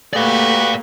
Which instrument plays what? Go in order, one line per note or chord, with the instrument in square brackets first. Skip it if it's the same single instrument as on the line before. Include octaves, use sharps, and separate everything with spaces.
[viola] A3 A#3 [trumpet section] F#4 G4 B4 [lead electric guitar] D5 F5